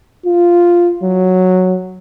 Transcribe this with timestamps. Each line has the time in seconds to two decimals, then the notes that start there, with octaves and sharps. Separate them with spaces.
0.26 F4
1.03 F#3